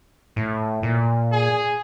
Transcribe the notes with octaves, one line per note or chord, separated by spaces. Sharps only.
A2
A#2
G#4